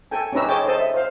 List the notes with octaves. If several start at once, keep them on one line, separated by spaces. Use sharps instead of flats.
A4 G5 G#5
C#4 D#4 G4 B4 A#5 E6
G#4 C#5 D#5 G5 A5 D6
A4 C5 D#5 A5
E5
C5 F5